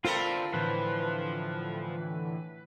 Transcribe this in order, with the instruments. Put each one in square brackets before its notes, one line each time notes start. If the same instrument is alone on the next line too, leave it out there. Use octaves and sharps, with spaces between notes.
[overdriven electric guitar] D3 C5 [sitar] C4 A4 A#4 [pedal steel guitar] F4 B5
[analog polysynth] A2 D3 E3 [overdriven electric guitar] F3 C5 [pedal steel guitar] B4